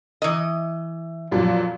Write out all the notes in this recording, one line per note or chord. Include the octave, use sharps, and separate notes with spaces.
E3 D#5
F2 A#2 F#3